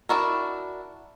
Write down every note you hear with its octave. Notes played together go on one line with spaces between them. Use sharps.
D4 E4 F#4 A#4